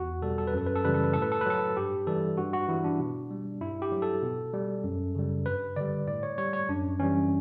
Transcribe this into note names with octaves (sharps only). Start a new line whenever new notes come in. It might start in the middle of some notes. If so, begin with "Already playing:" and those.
Already playing: E2 F#4
B2 G3 A4
A4
B4
F#2 A4
B4
A4
C#3 E3 G3 B4
A4
B4
A2 A4
B4
A4
B4
F#3 A4
G2 G4
E3 G3 A4
G2 F#4
F#4
E3 G3 E4
D4
B2
G3
G2 E4
G4
F#3
A4
B2
G3
F#2
C#3 G3
G2 B4
D3 G3 D5
A2 D5
C#5
G3 C#5
C#5
F#2 D4
E3 G3 C#4